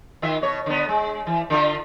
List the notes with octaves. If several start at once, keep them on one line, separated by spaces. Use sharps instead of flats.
D#3 F4 E5
B2 C#5
D3 B3
G#3
E3
D3 F4 E5